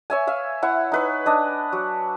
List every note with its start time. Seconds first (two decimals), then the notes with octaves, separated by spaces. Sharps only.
0.10 C#5 E5 G#5
0.27 E5 F5
0.62 E4 F#5 C#6
0.92 D#4 B4 C#6
1.26 D4 D#5
1.72 F#3